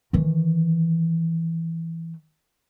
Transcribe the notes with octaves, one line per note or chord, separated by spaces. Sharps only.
D#3 E3